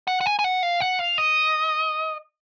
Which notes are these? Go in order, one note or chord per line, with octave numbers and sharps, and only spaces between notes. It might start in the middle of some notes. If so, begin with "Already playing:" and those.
F#5
F#5
G#5
G#5
F#5
F5
F#5
F5
D#5